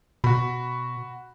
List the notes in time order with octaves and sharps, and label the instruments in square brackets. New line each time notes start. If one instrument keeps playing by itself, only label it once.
[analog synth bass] B2 [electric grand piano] F#4 B5